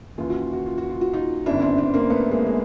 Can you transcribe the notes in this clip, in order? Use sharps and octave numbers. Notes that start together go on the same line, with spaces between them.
D#2 C#3 E3 F4
F#4
F4
F#4
F4
F#4
F4
F#4
D#4 F4
G1 F#2 C#3 D4 E4
C4 D4
C4 D4
A#3 C4
A3 B3
G#3 A#3
G#3